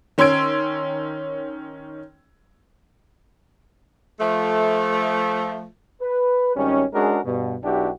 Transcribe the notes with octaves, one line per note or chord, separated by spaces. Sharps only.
D#3 C#4 C6 E6 G#6 D7
F3 A3
B4
G#1 D#3 G3 C#4
G#3 C#4 D4 F#4 G#4 A#4
G2 B2
B1 D4 E4 F#4 G4